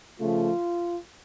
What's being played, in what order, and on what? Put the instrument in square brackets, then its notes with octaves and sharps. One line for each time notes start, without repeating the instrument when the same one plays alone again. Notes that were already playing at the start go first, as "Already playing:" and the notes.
[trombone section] C#3 F3 A3 F4